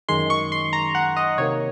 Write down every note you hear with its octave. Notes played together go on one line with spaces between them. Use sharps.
F#2 D#3 G#3 C6
C#6
C6
A#5
F#5
D#5
C3 D#3 A#3 C#5